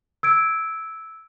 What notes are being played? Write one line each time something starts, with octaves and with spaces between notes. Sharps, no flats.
E6 G#6 D7